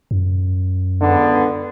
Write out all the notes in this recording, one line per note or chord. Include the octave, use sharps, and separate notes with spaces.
F#2
C#2 D3 B3